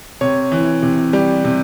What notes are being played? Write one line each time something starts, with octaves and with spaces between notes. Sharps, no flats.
C3 C#5
E3
C3
G3
C3